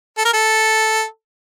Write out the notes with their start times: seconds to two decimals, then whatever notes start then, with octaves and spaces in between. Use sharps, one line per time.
0.18 A4
0.25 A#4
0.33 A4